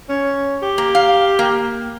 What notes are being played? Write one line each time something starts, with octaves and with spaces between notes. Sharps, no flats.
C#4
G4
A#3
F5
A#3